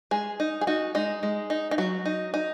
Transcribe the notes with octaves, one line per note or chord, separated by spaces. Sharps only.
G#3 G#4
D#4
G#4
D#4 F#4
G#3 D#4
G#3
D#4
D#4
F#3 F#4
D#4
D#4